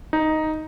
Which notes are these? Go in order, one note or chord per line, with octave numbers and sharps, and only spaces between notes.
D#4